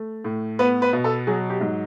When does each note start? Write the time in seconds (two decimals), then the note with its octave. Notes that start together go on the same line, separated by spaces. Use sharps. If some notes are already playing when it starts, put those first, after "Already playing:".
Already playing: A3
0.25 A2
0.59 B3 B4
0.82 B4
0.93 B2
1.04 A4
1.27 F#3 G#4
1.50 G4
1.61 G#2